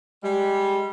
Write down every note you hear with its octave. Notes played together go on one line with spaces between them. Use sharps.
G3 G#3